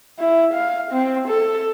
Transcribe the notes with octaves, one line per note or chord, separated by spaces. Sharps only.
E4
F5
C4
A4